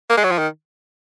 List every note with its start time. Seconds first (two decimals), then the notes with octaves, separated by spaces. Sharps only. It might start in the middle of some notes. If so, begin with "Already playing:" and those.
0.10 A#3
0.17 G#3
0.23 F#3
0.31 F3
0.38 D#3